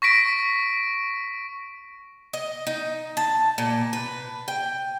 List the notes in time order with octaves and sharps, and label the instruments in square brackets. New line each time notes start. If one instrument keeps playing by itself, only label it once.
[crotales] C#6 A#6 B6 D7
[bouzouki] D#5
D#4
A5
A#2
B4
G5